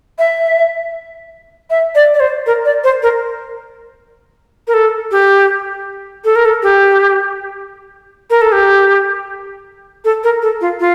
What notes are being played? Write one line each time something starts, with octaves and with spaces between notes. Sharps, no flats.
E5
E5
D5
D5
C5
A#4
D5
C5
A#4
A#4
A4
G4
A4
A#4
A4
G4
A#4
A4
G4
A4
A#4
A4
F4
F4